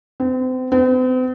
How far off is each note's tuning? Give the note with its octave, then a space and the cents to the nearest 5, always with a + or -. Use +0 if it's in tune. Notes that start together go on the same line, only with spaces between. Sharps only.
C4 -35
C4 -45